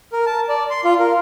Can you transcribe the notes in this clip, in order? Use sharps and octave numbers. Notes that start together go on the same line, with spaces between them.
A#4
A5
D5
C6
F4
A#4